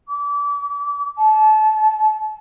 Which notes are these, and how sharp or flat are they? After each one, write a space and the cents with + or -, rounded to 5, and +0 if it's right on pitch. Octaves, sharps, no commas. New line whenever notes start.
D6 -30
A5 -30